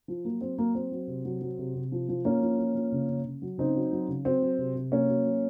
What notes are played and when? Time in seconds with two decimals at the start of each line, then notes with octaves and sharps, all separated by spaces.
0.08 F3
0.25 F#3 A#3
0.41 F#3 C4
0.58 F#3 A#3
0.75 F#3 C4
0.92 F#3
1.07 C3
1.25 F#3
1.41 F#3
1.58 C3
1.75 C3
1.92 F3
2.09 F3
2.25 F3 A#3 C#4
2.42 F3
2.58 F3
2.75 F3
2.92 C#3
3.09 C#3
3.25 C#3
3.42 F#3
3.58 C#3 C4 D#4
3.75 F#3
3.92 F#3
4.08 C#3
4.25 F#3 C4
4.42 F#3
4.58 C3
4.75 C3
4.92 F#3 A#3 C#4
5.08 F#3
5.25 F#3